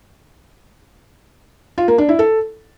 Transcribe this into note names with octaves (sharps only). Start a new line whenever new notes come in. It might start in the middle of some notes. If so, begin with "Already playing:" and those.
F4
A#3
D4
E4
A4